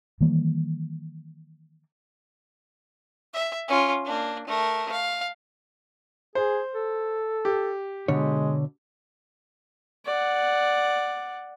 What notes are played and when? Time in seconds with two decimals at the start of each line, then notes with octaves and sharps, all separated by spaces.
0.21 D#3 E3 G3 A#3
3.34 E5
3.68 C#4 F4
4.05 A#3 D4
4.47 A3 A#4
4.92 F5
6.35 G#4 C5
6.75 A4
7.45 G4
8.08 B2 D3 G#3 C#5
10.05 D5 F#5